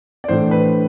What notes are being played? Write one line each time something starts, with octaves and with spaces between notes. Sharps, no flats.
D5
A2 E3 A3 D4 C5
B4